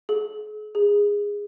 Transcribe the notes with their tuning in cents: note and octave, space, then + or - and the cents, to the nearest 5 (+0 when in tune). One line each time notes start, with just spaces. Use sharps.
G#4 +40
G#4 -15